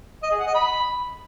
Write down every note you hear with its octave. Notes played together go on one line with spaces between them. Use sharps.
D#5
G#4
F#5
D#5
B5